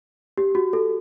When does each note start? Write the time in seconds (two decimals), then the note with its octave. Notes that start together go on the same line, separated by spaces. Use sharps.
0.37 G4
0.55 F#4
0.73 A4